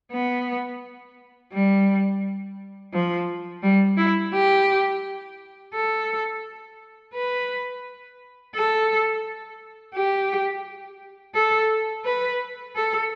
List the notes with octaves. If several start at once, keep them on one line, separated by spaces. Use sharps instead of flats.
B3
G3
F3
G3
E4
G4
A4
B4
A4
G4
A4
B4
A4